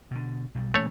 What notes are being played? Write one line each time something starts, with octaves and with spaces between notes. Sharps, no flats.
B2 D3
B1 B2 G3
A#2 E3 A3 C#4 C#5